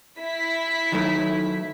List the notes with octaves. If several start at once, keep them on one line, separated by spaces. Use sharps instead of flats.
E4 B6
D#3 F#3 A3